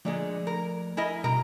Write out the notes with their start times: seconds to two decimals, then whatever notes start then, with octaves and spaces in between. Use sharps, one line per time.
0.05 A#2 D3 F3 G#3 A3 D5
0.47 A#4
0.97 E4 A#4 D#5 G#5
1.24 B2 G3 A#4 A#5